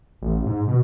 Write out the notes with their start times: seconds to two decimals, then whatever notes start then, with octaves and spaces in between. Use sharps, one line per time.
0.22 A1
0.46 G#2
0.68 B2